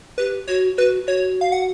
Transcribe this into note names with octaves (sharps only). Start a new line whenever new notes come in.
G4 B4
F#4 C#5
F#4 B4
F#4 C#5
F5
F#5